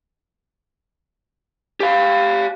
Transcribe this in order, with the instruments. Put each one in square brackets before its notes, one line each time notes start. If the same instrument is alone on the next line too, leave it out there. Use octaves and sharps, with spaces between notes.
[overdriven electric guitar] G4 F5